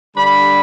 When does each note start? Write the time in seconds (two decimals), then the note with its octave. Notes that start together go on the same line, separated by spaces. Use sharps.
0.17 D3 G3 D4 B5